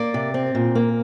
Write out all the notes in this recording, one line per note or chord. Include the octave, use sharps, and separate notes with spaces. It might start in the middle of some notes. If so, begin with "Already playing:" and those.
Already playing: A#3 D5
C3
C4
A#2
A#3